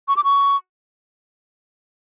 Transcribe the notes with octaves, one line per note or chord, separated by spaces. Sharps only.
C#6
D6
C#6